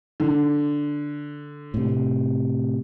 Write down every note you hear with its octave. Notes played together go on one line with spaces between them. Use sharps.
D3
A2 C3